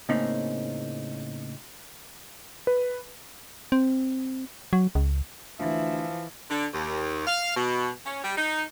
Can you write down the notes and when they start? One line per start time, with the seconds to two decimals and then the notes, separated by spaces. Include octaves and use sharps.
0.09 A2 C#3 A#3 C4 C#4 D#4
2.67 B4
3.72 C4
4.73 F#3
4.95 C#2
5.60 D2 E3 F3 E5
6.50 D3
6.74 D#2
7.27 F5
7.56 B2
8.06 C#4
8.24 G3
8.37 D#4